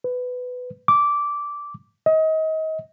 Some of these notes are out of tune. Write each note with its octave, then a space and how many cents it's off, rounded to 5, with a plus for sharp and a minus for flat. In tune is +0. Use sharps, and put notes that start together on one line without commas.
B4 +15
D6 -10
D#5 +30